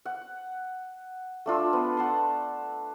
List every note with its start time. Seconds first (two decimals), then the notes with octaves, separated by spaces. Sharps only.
0.05 F#5
1.46 A3 D4 F4 E6
1.73 B3
1.97 F#5 A5 C6